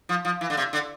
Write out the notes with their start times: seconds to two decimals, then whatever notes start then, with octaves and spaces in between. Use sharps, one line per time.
0.09 F3
0.25 F3
0.41 E3
0.50 D3
0.57 C3
0.73 D3